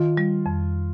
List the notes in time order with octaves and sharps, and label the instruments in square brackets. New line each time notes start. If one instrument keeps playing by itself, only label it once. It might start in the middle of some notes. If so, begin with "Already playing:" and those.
Already playing: [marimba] D#3 [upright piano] F4
[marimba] G3
F2